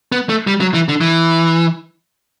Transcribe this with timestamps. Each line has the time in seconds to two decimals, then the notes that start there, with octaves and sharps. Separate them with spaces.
0.12 B3
0.29 A3
0.47 G3
0.60 F#3
0.74 E3
0.88 D3
1.01 E3